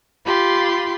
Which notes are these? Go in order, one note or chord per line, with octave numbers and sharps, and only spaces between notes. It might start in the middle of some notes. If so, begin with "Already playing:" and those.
F4 G4 B5 C6